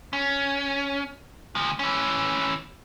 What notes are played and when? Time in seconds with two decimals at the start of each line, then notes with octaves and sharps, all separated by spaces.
0.13 C#4
1.55 D2 F3
1.79 E3 C#4